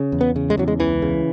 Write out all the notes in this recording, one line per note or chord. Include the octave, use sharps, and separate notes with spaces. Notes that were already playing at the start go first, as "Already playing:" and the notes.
Already playing: C#3
E2
B3
C#3
G#3
E2 F#3
G#3
C#2 E3
C#3